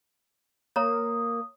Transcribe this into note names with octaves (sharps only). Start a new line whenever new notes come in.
A#3 C#5 A#5 D#6